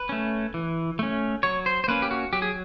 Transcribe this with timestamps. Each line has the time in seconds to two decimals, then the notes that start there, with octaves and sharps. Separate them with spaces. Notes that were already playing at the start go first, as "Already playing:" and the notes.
Already playing: B4
0.09 A3 C#4
0.54 E3
0.99 A3 C#4
1.43 F#3 C#5
1.66 C5
1.84 C5
1.88 A#3 C#4 B4
2.02 G4
2.11 F#4
2.33 F#3 G4
2.42 G#4